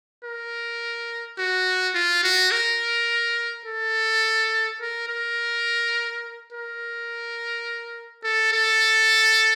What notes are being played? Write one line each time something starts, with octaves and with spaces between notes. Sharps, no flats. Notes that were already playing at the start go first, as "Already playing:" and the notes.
A#4
F#4
F4
F#4
A#4
A4
A#4
A#4
A#4
A4
A4